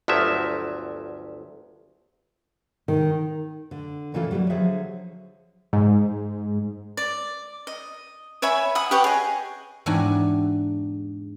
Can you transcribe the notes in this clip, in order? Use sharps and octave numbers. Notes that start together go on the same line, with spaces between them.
G1 D2 F3 F#3 E5
D#3
D3
A#2 C#3 E3 D4 F4 A4
F#3 G3 A3 A#3 F4
D3 F3 F#3 G#4 E5
G#2
D5
D#5
C#5 E5 G#5 B5
F#5 B5 D#6
G4 B4 C#5 F#5
G#4 D#5
E2 G#2 D4 F#4 G4 G#5